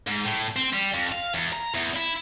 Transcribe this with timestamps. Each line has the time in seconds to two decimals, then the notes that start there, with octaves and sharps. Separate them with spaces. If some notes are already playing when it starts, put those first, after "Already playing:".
0.07 G#2
0.25 A2
0.56 C4
0.73 G3
0.94 F2
1.12 F5
1.34 E2
1.53 A#5
1.75 E2
1.96 E4